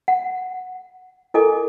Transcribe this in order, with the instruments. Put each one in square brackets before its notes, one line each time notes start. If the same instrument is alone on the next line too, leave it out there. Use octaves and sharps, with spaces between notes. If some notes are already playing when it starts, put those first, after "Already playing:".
[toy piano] F#5
E4 A4 A#4 D#5 G#5 D6